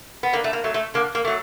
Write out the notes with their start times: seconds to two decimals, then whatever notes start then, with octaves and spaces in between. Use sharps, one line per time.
0.23 B3
0.33 D3 A#3
0.44 A3
0.53 A#3
0.64 F#3 A3
0.74 A3
0.94 D3 A#3
1.15 A#3
1.25 F#3 A3